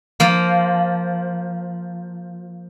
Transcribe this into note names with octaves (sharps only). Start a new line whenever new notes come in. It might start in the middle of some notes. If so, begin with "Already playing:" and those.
F3 A#3